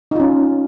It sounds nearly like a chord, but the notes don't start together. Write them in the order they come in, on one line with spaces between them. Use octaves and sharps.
D#4 F4 C#4